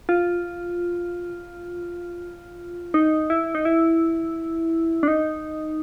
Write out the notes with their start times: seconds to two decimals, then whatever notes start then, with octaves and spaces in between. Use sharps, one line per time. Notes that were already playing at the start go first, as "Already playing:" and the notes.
0.09 F4
2.94 D#4
3.30 E4
3.55 D#4
3.65 E4
5.03 D4
5.08 D#4